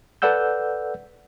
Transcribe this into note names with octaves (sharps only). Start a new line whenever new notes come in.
A4 B4 D5 F#5 E6 G6